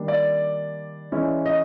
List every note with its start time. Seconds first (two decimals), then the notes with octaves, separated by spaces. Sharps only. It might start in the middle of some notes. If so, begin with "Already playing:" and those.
Already playing: D#3 G3 A#3 D4
0.08 D5
1.12 E3 G#3 C#4 E4
1.46 D#5